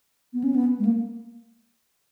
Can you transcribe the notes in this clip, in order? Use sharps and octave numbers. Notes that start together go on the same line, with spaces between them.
B3
C#4
B3
G#3
A#3